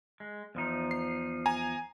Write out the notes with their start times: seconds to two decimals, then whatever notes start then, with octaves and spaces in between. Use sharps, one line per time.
0.20 G#3
0.55 E2 F3 D#4
0.91 C7
1.46 G#5 A#5